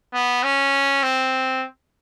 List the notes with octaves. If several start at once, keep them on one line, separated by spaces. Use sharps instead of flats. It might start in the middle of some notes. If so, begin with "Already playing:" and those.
B3
C#4
C4